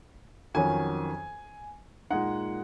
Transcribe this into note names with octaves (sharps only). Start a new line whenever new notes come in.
F2 D#3 F#3 C#4 G#5
A#2 G#3 D#4 F#5